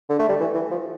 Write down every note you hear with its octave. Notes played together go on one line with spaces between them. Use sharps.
D3
A3
G3
E3
E3
F3